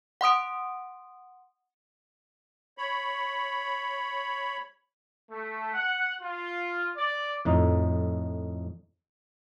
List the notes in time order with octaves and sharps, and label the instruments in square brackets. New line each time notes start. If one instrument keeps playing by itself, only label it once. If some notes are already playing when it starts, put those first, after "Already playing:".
[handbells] F#5 C6 D#6 D7
[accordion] C#5 B5
[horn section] A3
F#5
F4
D5
[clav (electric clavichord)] F2 A2 D#4